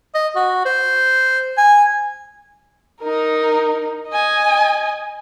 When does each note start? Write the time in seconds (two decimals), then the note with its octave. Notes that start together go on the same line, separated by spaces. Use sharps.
0.14 D#5
0.35 F#4
0.65 C5
1.58 G#5
3.01 D#4 A#4
4.08 D#5 G#5